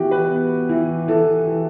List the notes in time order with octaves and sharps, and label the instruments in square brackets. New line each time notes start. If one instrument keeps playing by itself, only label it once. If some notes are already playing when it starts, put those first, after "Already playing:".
Already playing: [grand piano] E3 B3 F#4 G4
B4
B3
E3
E3 A4
E3